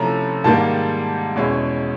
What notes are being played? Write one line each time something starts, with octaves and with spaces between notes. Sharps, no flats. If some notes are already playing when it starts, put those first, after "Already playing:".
Already playing: C3 F3 A3 C#4 E4 A#5
G#2 D#3 G3 A#3 A5
E2 B2 G#3 C#4 E4